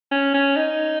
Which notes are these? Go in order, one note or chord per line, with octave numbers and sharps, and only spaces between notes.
C#4
C#4
D#4